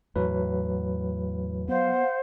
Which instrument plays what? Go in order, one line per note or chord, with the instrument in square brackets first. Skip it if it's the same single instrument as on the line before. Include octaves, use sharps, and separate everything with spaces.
[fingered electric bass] E2 A2 [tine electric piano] F#3 B4
[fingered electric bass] B3 [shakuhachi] C5 [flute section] F5 F#5